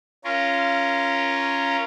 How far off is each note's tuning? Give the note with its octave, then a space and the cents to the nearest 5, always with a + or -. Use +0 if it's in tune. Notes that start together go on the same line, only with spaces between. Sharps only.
C#4 +0 F4 -20 A#4 +0